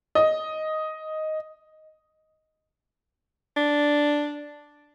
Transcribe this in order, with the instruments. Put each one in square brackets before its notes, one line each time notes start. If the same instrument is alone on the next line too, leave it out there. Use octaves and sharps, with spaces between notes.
[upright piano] D#5
[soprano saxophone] D4